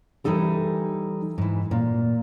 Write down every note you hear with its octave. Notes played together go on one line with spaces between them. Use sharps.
E3 F3 G3 D#4 A4 A#4
G#2 E3
A#2